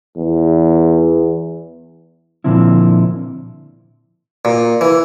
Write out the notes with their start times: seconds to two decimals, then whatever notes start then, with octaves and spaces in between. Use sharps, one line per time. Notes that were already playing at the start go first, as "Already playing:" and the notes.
0.17 E2
2.44 A#2 D3 F3 C4 E4
4.45 A#2
4.81 E3